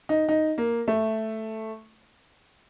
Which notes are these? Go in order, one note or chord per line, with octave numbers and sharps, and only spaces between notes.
D#4
D#4
A#3
A3